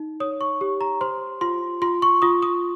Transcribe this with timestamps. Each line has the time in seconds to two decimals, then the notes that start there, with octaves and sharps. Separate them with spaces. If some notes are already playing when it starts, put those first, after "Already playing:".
Already playing: D#4
0.20 C#5 D#6
0.41 C#6
0.61 G4
0.81 A#5
1.01 C5 C6
1.41 F4 C6
1.82 F4 C6
2.02 C#6
2.22 F4 D#6
2.42 D#6